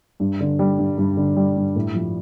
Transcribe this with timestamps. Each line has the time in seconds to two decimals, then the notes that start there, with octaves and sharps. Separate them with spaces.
0.20 G2
0.40 D3
0.59 G3
0.79 G2
0.98 G2
1.17 D3
1.37 G3
1.57 G2
1.76 A2
1.94 F3